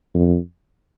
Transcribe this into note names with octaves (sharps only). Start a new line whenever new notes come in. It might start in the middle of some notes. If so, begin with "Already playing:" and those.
F2